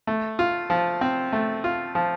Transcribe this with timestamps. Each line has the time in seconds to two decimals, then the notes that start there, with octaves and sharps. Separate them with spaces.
0.07 A3
0.39 F4
0.70 F3
1.01 C4
1.33 A3
1.64 F4
1.95 F3